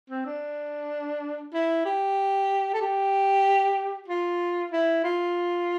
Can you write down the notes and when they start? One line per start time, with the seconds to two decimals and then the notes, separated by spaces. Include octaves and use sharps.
0.10 C4
0.26 D4
1.54 E4
1.85 G4
2.74 A4
2.81 G4
4.08 F4
4.72 E4
5.04 F4